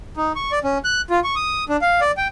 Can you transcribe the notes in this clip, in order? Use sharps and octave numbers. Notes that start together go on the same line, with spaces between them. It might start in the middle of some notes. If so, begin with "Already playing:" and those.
D#4
C#6
D5
C#4
F#6
F4
C#6
D#6
D4
F5
D5
G5